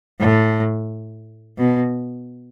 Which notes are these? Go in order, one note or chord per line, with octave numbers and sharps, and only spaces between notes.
A2
B2